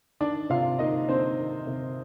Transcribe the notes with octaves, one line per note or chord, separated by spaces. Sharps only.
D#3 D4 D5
C3 F4 F5
A#3 D#4 D#5
C4 D4 C5
D#3
C3